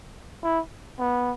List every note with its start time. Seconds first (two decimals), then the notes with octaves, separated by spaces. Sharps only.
0.43 E4
0.99 B3